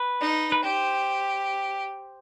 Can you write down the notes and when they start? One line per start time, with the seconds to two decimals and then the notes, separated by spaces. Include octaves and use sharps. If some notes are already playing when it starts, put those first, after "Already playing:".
Already playing: B4
0.21 D#4
0.52 B4
0.63 G4 C5